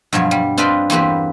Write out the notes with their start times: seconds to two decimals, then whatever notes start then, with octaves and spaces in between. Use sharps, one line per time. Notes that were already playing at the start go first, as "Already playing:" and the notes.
0.13 G2 B2 F3 F#3 C#5
0.31 G3
0.58 C4 D4 F4 B4 D#5 G5
0.90 E2 A#3 C4 G4 B4